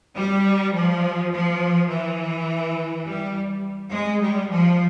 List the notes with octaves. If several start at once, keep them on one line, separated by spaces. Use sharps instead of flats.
G3
F3
F3
E3
G3
G#3
G3
F3